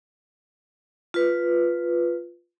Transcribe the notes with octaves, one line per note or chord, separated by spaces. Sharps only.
F4 B4